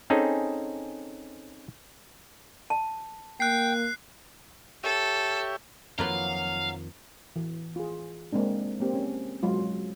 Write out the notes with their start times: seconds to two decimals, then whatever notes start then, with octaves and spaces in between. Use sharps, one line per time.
0.10 C4 C#4 D#4 G#4 A4
2.70 A5
3.40 A#3 G5 F#6 C7
4.84 G4 A4 C#5 E5
5.99 F2 D#3 F3 F#3 A#3 F4 B4 F5
7.36 E3
7.76 F4 G#4
8.33 G#3 A#3 C4 D4
8.80 A#3 C4 G4
8.94 C#4
9.43 F#3 G#3 F4